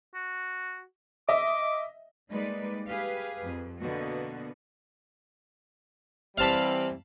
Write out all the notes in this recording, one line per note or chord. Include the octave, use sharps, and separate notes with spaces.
F#4
D#5 E5 D6
G3 G#3 A#3 D#4 B4 D5
G4 G#4 B4 F5
F2
B2 D3 A#3 B3 F#4
E3 G3 C4 F5 A5 B5